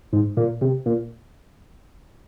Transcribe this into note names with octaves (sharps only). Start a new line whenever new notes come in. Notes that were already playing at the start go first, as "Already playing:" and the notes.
G#2
A#2
C3
A#2